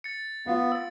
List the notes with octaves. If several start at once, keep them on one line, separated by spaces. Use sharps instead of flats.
A6 C#7
B3 F4 F5 F#5
E6 A6